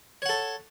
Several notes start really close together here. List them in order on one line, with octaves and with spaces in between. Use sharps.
C#5 F#5 A4